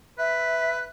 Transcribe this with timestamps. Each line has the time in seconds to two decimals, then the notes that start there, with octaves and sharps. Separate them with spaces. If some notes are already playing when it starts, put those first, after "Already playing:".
0.18 B4 E5